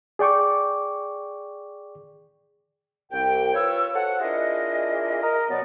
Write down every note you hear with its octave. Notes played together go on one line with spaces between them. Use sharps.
G#4 D5 G5 C#6 D6
C2 G5
F4 B4 C#5 E6
F#4 A4 C5 C#5 F#5
D4 E4 F4 G#4 A#4 D#5
A#4 D#5
B2 F#3 B3 D5